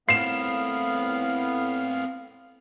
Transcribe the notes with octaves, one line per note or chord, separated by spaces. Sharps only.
A2 B3 C4 A#4 F5 C7 E7